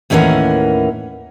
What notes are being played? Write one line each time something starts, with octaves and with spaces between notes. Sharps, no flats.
D#2 A2 E3 C#4 A#4 F#5